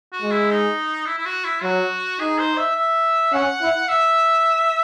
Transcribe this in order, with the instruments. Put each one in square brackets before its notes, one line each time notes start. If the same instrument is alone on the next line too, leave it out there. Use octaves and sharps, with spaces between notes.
[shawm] F#4
[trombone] G#3
[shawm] E4
D#4
E4
E4
F#4
E4
[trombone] F#3 [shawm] F#4
[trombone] D#4 [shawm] G#4
[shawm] C5
E5
E5
[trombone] C#4 [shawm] F#5
[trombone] E4
[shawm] E5